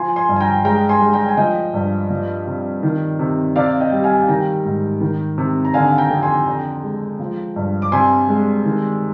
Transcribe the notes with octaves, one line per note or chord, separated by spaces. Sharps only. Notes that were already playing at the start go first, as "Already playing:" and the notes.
Already playing: F3 G#5 C6
G#5 C6
G2
G#5
G5 A#5
G#3 G5 A#5
G#5 C6
G#3
G5 A#5
G#5
F3 D#5 G5
G2
F3
C3
D#3
C3
C3 D5 F5
D#5 G5
G3
F5 G#5
D#3 G5 A#5
G#2
D#3
C3
A#5
D3 F5 G#5
G5 A#5
F2
G#5 C6
D3 G5 A#5
G#3
F3
G2
D6
C3 G#5 C6
G#3
D#3